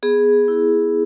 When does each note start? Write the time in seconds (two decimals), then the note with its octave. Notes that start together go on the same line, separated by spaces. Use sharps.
0.03 B3 G#4
0.48 E4